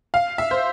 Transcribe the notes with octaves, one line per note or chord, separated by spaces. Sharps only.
F5
E5
C5